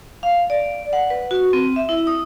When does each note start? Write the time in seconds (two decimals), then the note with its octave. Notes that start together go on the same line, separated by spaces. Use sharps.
0.23 F5
0.50 D5
0.93 F#5
1.10 B4
1.31 F#4
1.53 C4
1.76 E5
1.89 E4
2.07 D#6